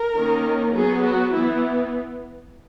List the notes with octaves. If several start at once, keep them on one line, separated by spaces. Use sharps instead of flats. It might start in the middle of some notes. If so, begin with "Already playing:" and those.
Already playing: A#4
D#3 A#3 C#4
F#3 B3 G#4
F#4
E3 B3 E4